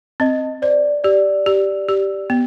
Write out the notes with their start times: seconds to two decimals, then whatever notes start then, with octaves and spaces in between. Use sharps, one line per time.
0.20 C4 D#5
0.62 C5 D5
1.04 G4 D5
1.46 G4
1.89 G4
2.30 B3